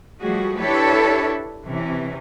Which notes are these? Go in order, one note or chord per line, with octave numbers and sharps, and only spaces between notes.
F3 G3 A3 F#4 G#4
D4 E4 G4 A4 B4 C#5
C3 E3 C#4